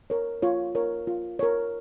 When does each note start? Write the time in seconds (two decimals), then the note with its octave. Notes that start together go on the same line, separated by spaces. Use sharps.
0.10 A#4 C#5
0.42 F4 C#5
0.75 A#4 C#5
1.07 F4
1.39 A#4 C#5